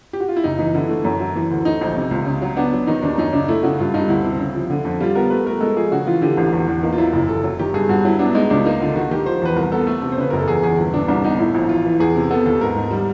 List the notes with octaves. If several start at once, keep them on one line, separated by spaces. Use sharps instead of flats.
G4
F#4
F4
E4
F#1 D#4
E3 D#4
D3 E4
A3
F#2
F#3
E3
D2
A3 D#4
A#1 D#4
C3
C#2
C#3
F#3
B3 D4
F#3
D#3 D#4
D#2 D4
F#2 D#4
C#3 D4
A3 E4
C#3 F#4
G2 F4
G2 D#4
D2 E4
C3
C#3
F3
D3
F2
G3 F4
B3 A#4
A3 B4
A3 A#4
G#3 A4
F3 G#4
C#3 F#4
E3 F4
D3 G4
A1
E2
E2
A#3 D#4
F4
F#3 E4
F#1 E4
F#1 A4
F#3
D#3 G4
G2 G#4
G2 F#4
F#3 E4
B3 D4
G#3 D#4
C#2 D4
A#3 D#4
D3 F4
D#3 F#4
D#3 G4
F3 C5
E2 B4
C2 A#4
B3 A4
A3 A4
C3
C5
C#3 B4
F#1 A#4
A4
E2 G#4
E2 G#4
G1
G1 D4
C2 D4
B3 D#4
A2 E4
A#1
E3 F4
E3
E2 G#4
C3
B3 A4
D#2 A4
G#2 A#4
G#2
G3